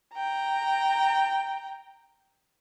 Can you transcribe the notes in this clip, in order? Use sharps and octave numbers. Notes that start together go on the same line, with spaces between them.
G5 A#5